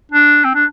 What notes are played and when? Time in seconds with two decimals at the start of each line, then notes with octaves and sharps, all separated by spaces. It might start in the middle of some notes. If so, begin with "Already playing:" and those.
0.11 D4
0.44 C4
0.55 D4